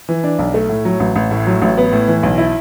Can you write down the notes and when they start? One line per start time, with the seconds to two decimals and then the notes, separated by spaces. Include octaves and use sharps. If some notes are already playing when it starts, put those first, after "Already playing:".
0.09 E3
0.24 D4
0.39 B1
0.54 A3
0.69 A2
0.85 F#3
1.00 A1
1.16 A1
1.31 A2
1.47 F#3
1.62 A1
1.77 B3
1.93 A2
2.08 E3
2.23 B1
2.38 E4